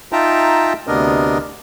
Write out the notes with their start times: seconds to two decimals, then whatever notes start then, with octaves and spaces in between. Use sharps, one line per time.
0.12 D#4 F4 E5 G5 A5 A#5
0.87 D2 C3 B3 D4 A#4 D#5